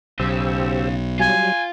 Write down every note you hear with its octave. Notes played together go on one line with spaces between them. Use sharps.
B1 C#3 G4 C5 E6
F#3 G3 F4 G#5